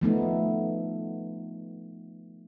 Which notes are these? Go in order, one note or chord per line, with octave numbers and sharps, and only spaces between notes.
F3 A3 B3 D#4